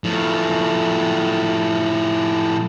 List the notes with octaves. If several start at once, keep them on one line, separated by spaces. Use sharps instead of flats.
A2 F3